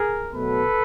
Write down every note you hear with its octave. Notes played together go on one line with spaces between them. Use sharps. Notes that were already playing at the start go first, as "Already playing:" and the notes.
Already playing: G#4 A#4
B2 F#3 A3 A4 B4